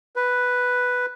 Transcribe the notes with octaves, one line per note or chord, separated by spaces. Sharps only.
B4